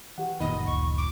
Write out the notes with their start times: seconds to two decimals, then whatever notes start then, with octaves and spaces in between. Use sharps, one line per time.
0.18 E3 G4 F#5
0.40 F#1 A#2 D#3 D#5 B5
0.66 D2 C#6
0.98 D6